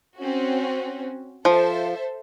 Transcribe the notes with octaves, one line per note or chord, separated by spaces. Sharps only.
C4 C#4 F#4
F3 A4 C5 E5